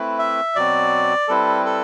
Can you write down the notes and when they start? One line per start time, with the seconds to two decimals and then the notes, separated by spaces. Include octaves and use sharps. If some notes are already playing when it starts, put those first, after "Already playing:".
Already playing: A3 C4 E4 B4
0.19 E5
0.56 B2 F#3 C4 F#4 D5
1.28 G3 C4 E4 A4 B4
1.65 A4